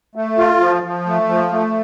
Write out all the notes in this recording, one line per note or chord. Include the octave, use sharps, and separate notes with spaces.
A3
F4
F3
F3
A3
F3
A3